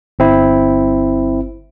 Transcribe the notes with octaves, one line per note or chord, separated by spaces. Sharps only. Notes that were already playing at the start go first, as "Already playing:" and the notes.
G1 C4 E4